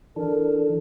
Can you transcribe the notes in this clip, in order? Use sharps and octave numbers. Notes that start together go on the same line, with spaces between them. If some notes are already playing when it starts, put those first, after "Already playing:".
E3 D4 A4 A#4